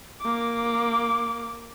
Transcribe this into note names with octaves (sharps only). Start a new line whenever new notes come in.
A#3 D6